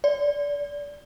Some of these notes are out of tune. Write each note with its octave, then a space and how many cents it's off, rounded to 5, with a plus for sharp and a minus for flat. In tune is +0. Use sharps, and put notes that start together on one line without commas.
D5 -25